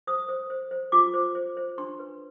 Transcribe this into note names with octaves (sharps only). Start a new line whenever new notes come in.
C5 D#6
C5
C5
C5
F4 D6
C5
C5
C5
D4 C6
B4